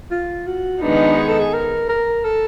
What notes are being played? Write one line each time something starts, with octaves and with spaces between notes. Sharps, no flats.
F4
F#4
D#3 G#3 B3 D4 D#4
G#4
A4
G#4
A#4
A#4
A4